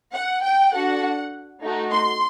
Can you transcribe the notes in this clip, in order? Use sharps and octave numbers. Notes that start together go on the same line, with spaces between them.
F#5
G5
D4 F#4 A4 F#5
A3 D#4 F#4
C6